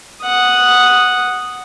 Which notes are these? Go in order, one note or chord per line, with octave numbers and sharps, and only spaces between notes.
F#5 D#6